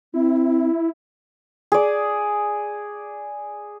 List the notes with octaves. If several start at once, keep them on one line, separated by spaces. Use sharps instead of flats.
C4 E4
G#4 D5